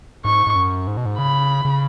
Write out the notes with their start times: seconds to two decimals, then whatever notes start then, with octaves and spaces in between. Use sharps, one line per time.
0.25 G#2 C#6
0.47 G#2
0.55 F#2
0.87 G#2
0.97 B2
1.06 G#2
1.18 C#3 B5
1.65 C#3